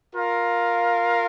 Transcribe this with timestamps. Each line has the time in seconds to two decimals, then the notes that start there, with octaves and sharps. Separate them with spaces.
0.14 F4 A#4 F5